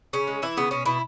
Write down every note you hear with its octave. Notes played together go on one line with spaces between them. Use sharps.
C#3 C#4
G#3
E3 E4
C#3 B3
B2 C#4
B2 E4